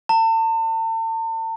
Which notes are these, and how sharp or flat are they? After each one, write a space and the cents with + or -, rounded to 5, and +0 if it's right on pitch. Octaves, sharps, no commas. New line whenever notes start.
A5 +40